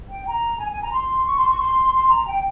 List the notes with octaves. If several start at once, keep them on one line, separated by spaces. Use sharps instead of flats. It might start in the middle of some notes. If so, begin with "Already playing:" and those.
G5
A#5
G#5
G#5
A#5
C6
C#6
C6
C#6
C6
C6
A#5
G5